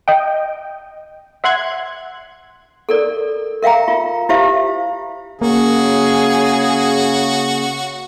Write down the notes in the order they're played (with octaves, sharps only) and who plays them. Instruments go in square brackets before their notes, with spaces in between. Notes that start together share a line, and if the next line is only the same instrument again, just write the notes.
[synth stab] D#5 G5
E5 F#5 C6 F#6 G#6
[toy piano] A4 A#4 D5
A#4 E5 F5 G5 A#5
F4
E4 F4 G4 C5 E5 F5
[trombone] C#3 [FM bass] A#3 [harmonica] F#4 [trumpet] G#4